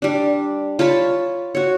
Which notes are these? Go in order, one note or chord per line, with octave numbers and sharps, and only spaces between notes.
G3 D4
F4 C#5 A5 B5
F#4 C#5